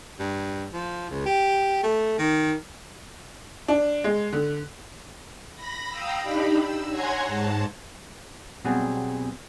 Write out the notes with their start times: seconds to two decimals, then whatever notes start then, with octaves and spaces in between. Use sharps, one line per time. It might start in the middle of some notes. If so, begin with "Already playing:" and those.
0.19 G2
0.73 F3
1.10 C#2
1.26 G4
1.83 A3
2.18 D#3
3.68 D4
4.04 G#3
4.33 D3
5.55 B5 A#6
5.89 F5 G5 A#5 D#6 E6
6.22 D4 D#4 G4 B5
6.58 E6
6.90 C#5 F#5 G#5 A#5 C6 G#6
7.27 G#2 A5
8.64 B2 F#3 G3 B3 C4 G#4